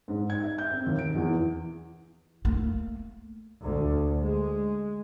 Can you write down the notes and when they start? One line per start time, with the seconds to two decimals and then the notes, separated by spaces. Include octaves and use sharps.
0.08 G#2
0.30 G#6
0.44 E5
0.58 G6
0.72 C4
0.86 D#2
0.99 D7
1.15 E2
2.45 A3 A#3
3.62 D2
4.23 G#3